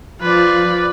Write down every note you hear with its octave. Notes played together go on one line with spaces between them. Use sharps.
F3 B4 D5